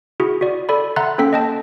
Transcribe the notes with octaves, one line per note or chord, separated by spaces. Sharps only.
E4 F#4 G#4
F#4 D5
A4 D5 B5
E5 F#5 A#5 C6 F#6 A6
A#3 C#4 A4 G5 B6
D#5 G5 A5